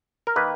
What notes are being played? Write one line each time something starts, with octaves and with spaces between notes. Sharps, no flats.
A#4
D#3 A#3 B4